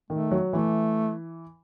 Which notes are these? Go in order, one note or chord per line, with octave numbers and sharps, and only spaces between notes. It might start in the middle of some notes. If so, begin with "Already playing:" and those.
D#3 A3
F#3
E3 A3